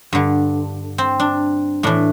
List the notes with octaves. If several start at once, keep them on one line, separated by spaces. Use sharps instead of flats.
G2 D3
C4
D4
A2 E3 D4